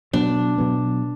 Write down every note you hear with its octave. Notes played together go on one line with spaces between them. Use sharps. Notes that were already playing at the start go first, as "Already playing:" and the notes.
B2 F#3 B3 D4
B2 F#3 B3